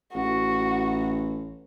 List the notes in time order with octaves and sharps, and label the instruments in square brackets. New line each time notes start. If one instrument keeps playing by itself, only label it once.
[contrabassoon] A1 [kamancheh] F#4